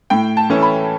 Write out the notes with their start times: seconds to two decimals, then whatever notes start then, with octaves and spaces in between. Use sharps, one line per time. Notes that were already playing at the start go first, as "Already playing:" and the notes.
0.10 A2 G5
0.37 A5
0.50 E3 A3 C#4
0.63 B5